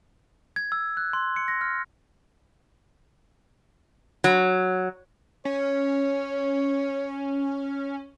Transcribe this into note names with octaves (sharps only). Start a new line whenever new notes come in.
G#6
E6
F#6
C6
C#7
A#6
F6
F#3
C#4 C#5